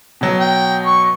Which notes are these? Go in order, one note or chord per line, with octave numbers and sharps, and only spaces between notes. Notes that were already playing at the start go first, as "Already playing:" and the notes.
B2 F#3
G5
C#6